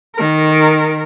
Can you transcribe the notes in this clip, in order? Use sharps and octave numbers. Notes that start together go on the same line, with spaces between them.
D#3 A#4